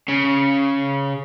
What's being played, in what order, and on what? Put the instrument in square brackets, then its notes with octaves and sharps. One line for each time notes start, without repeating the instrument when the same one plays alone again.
[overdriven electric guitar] C#3